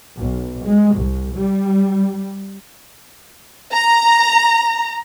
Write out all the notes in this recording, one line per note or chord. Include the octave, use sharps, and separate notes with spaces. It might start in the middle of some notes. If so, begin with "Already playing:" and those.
B1
G#3
C2
G3
A#5